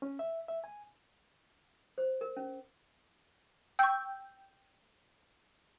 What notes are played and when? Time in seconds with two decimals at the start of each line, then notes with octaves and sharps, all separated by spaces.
0.02 C#4
0.19 E5
0.48 E5
0.64 G#5
1.98 C5
2.21 A#4
2.37 C#4
3.79 G5 C#6 E6